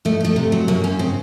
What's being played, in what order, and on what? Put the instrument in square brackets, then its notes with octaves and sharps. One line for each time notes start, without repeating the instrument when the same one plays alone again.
[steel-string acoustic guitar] F2 A3
F2 A3
C3
F#3
F#2 A#3
F#2 C#4
C#3 C4